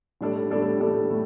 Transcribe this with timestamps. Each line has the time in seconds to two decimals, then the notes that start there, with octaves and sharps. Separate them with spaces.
0.21 A2 G3 D4 A4 D5
0.50 A2 G3 D4 A4 D5
0.80 A2 G3 D4 A4 D5
1.10 A2